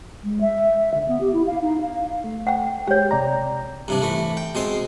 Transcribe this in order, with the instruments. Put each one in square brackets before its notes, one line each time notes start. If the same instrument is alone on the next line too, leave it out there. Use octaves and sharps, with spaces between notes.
[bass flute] G#3
E5
D3
B3
G4
E4
F5
D#4
F5
[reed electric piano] A3
[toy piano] F#5 G5
[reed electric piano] G#3 G4 [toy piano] C#5 G5
[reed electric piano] C3 D5 A#5
[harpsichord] G2 C3 D4
E3 A3
G5
B2 G#3 C4 C6